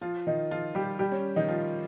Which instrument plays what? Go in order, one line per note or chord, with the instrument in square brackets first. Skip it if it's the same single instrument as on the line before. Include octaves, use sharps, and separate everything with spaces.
[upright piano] F3 F4
D#3 D#4
F3 F4
G3 G4
G3 G4
C#4
D#3 D#4
F3 F4